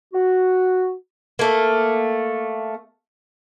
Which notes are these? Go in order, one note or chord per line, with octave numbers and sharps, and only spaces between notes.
F#4
A3 A#3